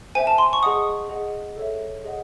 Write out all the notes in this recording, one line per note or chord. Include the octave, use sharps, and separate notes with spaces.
C5 E5 G#5
A5
C6
C#6
G#4 D#5 F#5 D#6
G#4 D#5 F#5
A4 C#5 E5
G#4 D#5 F#5